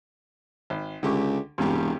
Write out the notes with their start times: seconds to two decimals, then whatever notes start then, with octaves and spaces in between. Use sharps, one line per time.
0.70 G#1
1.03 C#2 D3 G4 C#6
1.58 E1 G2 C3 G4